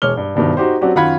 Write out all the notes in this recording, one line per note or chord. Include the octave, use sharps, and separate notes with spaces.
E1 G#3 C#5 D6 F6 G7
G2
F#1 G2 B2 D#3
D#4 F#4 G4 C5
F#3 C4 D4 F#4 G4
F#2 D#3 F4 F#5 B5 G#6